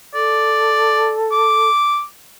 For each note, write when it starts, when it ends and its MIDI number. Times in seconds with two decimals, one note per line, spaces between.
0.14 1.69 69
0.14 1.13 74
1.32 2.03 86